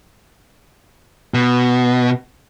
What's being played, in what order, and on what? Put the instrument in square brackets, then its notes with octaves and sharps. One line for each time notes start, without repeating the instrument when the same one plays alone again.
[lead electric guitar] B2